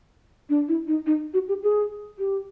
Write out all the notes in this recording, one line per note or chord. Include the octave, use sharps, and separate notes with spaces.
D4
E4
D#4
D#4
F#4
G4
G#4
G4